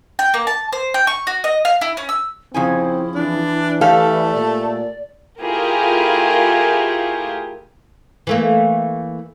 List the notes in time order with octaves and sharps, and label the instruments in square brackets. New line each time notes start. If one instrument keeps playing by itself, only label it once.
[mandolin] G5
A#3
A5
C5
G5
C#6
F#4
D#5
F5
E4
C#4
E6
[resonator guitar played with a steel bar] F2 C#3 G#5 [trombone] C4 [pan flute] E4
[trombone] E3 [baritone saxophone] D4
[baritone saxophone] A3 [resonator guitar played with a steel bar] G4 A4 F5 [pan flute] D5
[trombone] A#2 [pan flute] D5
[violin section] A3 E4 F4 G4 G#4 A#4
[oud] E3 A3 A#3